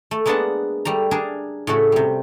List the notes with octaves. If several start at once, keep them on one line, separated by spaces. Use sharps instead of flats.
A3
G#3 A#3 B3 D4 F#5 A5
G3 A3 A#5
D4 G#4 A#4 A5
A2 C#3 A3 F#4
C3 G3